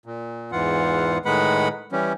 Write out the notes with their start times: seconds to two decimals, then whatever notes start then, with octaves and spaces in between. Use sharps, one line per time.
0.06 A#2
0.52 E2 G#2 E3 F4 F#5
1.26 A2 D#3 G#3 B4 F#5 B5
1.92 E3 G3 C#4